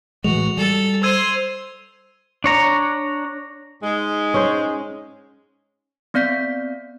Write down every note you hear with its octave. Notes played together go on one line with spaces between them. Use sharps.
A2 E3 G#3 F#4 F7
G3 A4
C5 C6 E6 G#6 D#7
D4 C#5 A#5
G#2 G#3
C#4 C5
B3 C4 D5 G6 B6